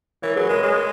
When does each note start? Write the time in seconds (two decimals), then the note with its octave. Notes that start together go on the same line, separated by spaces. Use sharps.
0.22 E3 A#4 C#5
0.36 F#3 G#4 B4
0.49 G#3 A#4 C#5
0.63 G#3 A#4 C#5